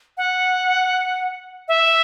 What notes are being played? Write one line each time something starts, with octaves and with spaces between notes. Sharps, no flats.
F#5
E5